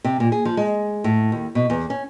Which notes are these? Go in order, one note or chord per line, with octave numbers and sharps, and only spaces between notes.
C3
A#2
G#4
F3
G#3
A2
D#2
B2
E2
C#4